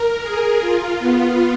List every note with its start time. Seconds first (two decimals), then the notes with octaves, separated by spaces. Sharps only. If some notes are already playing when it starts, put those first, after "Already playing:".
Already playing: A#4
0.22 G#4
0.61 F4
0.99 B3